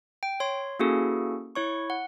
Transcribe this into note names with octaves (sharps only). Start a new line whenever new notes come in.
G5
C#5 C6
A#3 C#4 E4 F#4 G#4 A4
E4 C#5 C#6
F#5